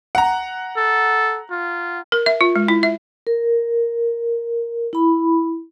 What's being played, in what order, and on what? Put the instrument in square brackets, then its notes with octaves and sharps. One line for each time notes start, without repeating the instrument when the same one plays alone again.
[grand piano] F#5 A#5
[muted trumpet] A4
F4
[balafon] A#4
E5
F4
G#3
E4
E5
[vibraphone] A#4
E4 B5